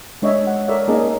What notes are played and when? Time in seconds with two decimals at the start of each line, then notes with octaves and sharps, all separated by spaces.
0.22 G#3 D4 C#5 D#5 E5
0.47 F#5
0.68 A4 A#4 C#5 D5 E5
0.88 A#3 C#4 D#4 G#4 D#5 A5